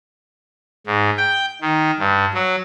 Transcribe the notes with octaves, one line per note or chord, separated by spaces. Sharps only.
G#2
G5
D#3
G2
F#3